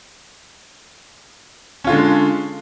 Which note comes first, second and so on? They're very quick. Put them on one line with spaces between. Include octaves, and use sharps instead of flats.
C#4 F4 D3 G#3